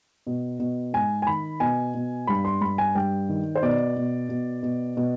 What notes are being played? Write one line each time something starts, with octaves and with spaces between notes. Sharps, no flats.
B2
B2
G#2 G#5
G#5
D#3 B5
B2 G#5
B2
G2 B5
C6
G2 B5
G#5
G2 G5
D#3
C5
B2 D5
B2
B2
B2
B2